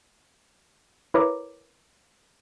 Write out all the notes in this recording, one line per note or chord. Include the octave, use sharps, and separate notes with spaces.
E4 A#4 B4 C#5 A#5 D6